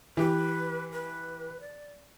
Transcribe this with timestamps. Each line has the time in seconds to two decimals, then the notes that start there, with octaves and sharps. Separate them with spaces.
0.17 E3 G4 B4
0.92 B4
1.60 D5